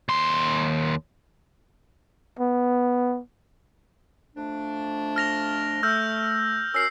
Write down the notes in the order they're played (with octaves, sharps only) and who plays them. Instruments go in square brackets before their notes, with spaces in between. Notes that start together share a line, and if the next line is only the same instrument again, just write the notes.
[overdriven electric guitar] D#2 C6
[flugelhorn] B3
[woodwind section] F2 A3 D4
[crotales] F6 A#6 F7
[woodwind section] A3 [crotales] E6 F6 G6
[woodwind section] C#4 F#4 A#4 [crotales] E6 C7